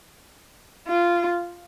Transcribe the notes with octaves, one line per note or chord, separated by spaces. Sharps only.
F4